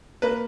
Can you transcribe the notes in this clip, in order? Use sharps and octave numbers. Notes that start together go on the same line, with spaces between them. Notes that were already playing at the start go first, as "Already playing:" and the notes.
A#3 B4